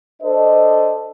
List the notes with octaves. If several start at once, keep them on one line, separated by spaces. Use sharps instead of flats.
D4 A4 C5 D#5